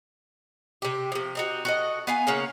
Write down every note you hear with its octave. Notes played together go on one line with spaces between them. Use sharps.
C3 G4
C3 F3
C4 D#4 F#4
F#4 A4 D#5
B3 F5 G#5
C#3 A#3 C#4 F#5